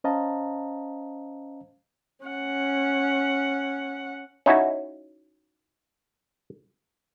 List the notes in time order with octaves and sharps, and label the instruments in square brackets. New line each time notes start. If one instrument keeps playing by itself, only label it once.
[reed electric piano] C#4 C5 D#5 F5 A5 A#5
[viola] C#4 F#5
[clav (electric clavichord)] C#4 D#4 E4 F#4